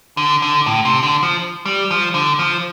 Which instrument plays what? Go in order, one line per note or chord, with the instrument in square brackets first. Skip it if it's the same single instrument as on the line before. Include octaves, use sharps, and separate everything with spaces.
[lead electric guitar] D3
D3
A2
C3
D3
F3
G3
F3
D3
F3